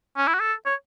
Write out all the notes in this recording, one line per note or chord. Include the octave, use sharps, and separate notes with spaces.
C#4
E4
F#4
A4
C#5